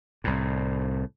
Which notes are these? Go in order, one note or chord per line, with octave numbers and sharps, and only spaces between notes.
C2 A2